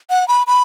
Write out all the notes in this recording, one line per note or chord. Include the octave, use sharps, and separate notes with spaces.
F#5
B5
B5